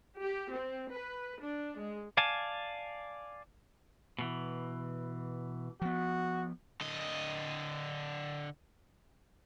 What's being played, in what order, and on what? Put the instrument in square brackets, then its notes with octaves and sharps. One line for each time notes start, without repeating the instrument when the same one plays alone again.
[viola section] G4
C4
B4
D4
G#3
[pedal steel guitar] D5 F5 G#5 A5
[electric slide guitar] B2 E3
[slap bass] F3 B3 [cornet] F#4
[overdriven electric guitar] D3 D#5